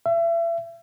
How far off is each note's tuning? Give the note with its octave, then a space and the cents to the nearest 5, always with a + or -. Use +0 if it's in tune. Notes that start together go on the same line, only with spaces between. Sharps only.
E5 +35